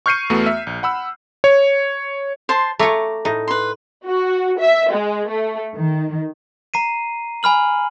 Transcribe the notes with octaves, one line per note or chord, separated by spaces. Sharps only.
C#6 F6 G6 C7 C#7 D#7
E2 A3 B3 F#4
E5
A#1
F#5 B5 E6
C#5
C5 A5 C6
A3 F4 C#5 A#5 D6
A2 D#4
B4 C6
F#4
E5
G#3
A3
D#3
A#5 C7 D#7
G#5 B5 F6 F#7